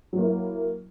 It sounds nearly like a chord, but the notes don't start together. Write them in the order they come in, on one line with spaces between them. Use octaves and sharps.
F#3 A#3 E4